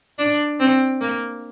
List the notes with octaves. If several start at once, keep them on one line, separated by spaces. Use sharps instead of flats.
D4
C4
A#3